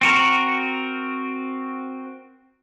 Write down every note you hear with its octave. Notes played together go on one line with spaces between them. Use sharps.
C4 F#4 A#4